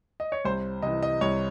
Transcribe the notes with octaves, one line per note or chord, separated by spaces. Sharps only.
D#5
C#5
C2 C5
C3 E3 D#5
D#5
C2 C#5